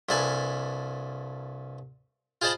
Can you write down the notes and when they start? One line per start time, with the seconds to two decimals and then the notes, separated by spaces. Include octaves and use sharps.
0.09 C2 G2 A4 B4 G#5
2.42 F4 G#4 C5 D#5 A5 B5